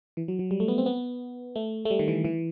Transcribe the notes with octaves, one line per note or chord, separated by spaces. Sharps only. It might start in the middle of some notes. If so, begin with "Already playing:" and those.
E3
F#3
F#3
G3
A3
B3
C4
B3
A3
A3
G3
D#3
E3
E3